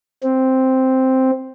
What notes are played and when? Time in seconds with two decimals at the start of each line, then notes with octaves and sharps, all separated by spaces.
0.23 C4